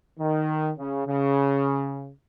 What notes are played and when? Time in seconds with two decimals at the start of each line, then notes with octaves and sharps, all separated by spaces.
0.20 D#3
0.78 C#3
1.07 C#3